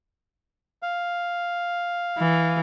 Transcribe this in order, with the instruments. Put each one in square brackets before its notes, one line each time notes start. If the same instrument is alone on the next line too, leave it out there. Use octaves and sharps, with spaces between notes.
[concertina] F5
[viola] E3